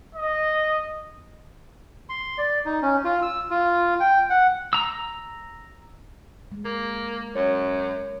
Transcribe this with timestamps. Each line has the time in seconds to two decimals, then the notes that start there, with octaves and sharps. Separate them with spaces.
0.15 D#5
2.09 C6
2.38 D5
2.66 D#4
2.82 C#4
3.05 F4
3.22 E6
3.50 F4
4.00 G5
4.30 F#5
4.73 A#5 E6
6.52 G#3
6.65 A#3
7.36 F#2 C#5